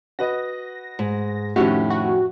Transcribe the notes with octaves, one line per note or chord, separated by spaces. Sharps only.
F#4 B4 D#5 A#6
G#2
F2 A2 D#3 C#4 F#4 G4
F#4